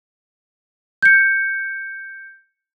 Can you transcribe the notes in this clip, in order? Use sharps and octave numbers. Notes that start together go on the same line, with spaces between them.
G6 C#7